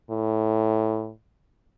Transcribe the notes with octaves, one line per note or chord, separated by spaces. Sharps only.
A2